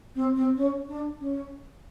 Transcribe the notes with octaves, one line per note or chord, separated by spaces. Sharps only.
C4
C4
C#4
D4
C#4